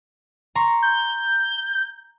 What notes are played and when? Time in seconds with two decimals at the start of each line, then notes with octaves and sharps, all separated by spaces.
0.55 A#5 C6 C#6
0.83 G6